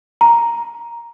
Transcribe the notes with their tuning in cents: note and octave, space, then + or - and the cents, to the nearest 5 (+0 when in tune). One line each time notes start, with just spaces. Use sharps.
A#5 +5